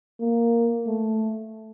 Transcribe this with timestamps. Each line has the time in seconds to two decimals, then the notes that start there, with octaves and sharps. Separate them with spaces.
0.21 A#3
0.87 A3